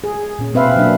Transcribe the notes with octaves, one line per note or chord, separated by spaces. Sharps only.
G#4
A#2 C#4
B2 C4 B4 C5 E5 F5
B2 F#3 A#3 D4 E5